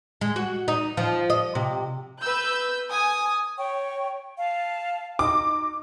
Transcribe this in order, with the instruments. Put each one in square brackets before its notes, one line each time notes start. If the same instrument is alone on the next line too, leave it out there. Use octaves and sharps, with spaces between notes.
[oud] G#3
F#4
D#4
F3
D#5
C3
[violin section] B4 E6 G6
G#5 D#6
[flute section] C#5 G5 C#6
F5 A5
[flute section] D#4 [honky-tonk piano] D6